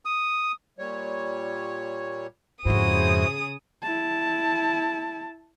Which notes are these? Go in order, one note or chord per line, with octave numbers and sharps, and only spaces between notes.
D#6
A#2 G3 C#5
F2 G#2 C#3 E4 F#4 G#4 C5 D#6
E4 A5